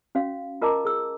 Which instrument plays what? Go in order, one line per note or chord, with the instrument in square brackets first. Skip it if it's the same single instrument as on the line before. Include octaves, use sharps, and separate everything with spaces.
[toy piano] C#4 F#4 F5
F4 A#4 D#5 A5 A#5 D6
G#4 E6